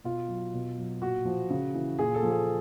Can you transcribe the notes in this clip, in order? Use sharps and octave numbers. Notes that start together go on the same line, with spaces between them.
B2 F4
F#3
B2
F#3
A#2 F#4
F3
C#3
E3
A#2 G#4
A4
F3
G#4